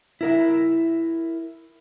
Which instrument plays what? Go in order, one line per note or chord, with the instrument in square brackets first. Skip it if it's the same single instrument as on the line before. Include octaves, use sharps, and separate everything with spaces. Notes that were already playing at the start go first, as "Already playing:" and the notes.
[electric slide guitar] E4 A#4 E5